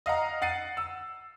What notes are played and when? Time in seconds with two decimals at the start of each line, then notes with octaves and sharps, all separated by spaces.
0.06 D#5 F5 F#5 A#5
0.42 F#5 A6 C7 D#7
0.77 E6